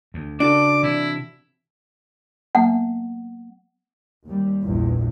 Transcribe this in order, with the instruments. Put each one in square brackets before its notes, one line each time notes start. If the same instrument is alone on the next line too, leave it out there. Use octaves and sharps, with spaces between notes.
[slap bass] D2
[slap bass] C#3 [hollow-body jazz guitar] D4 F#4 A4 [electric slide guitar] D5 [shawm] D6
[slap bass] C3 E3 [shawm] E4
[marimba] F#3 A#3 B3 [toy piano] F#5
[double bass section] D#2 G3
A#1 E2 G2